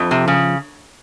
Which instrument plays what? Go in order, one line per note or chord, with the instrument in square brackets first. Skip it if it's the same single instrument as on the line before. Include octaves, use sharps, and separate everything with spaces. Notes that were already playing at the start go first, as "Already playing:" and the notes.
Already playing: [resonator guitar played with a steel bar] F2 [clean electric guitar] F3
[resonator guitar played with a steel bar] C3
C#3